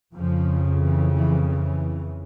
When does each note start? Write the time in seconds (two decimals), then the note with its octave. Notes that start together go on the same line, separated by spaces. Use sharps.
0.15 F2 C#3 F3
0.81 E3
1.15 E3
1.48 E3